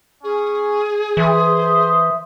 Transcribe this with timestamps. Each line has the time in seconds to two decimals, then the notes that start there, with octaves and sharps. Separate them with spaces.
0.23 C#4 G#4
1.17 E3 C5 E5 D#6